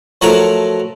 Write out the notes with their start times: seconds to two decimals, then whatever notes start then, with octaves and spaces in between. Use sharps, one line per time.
0.21 F3 F#3 A3 F#4 A#4 C#5